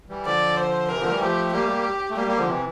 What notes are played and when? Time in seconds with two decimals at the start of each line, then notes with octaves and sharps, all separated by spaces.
0.09 E3 G3
0.25 D3 F3 D5
0.57 C5
0.89 C3 E3 A#4
0.99 D3 F3
1.05 A3
1.10 E3 G3
1.21 F3 A3 G4
1.52 G3 A#3 G4
1.64 A3
1.68 G3 A#3
2.10 A3
2.16 G3 A#3 G4
2.27 G3 A#3
2.38 D3 F3
2.48 C3 E3